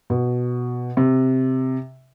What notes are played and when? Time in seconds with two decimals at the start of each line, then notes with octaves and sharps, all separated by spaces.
0.10 B2
0.97 C3